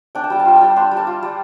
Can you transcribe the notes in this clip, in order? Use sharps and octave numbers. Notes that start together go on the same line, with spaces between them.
D4 G5
A5
G3 G5
A5
F4 G5
A5
G3 G5
D4 C6
G3
A5
F4
G3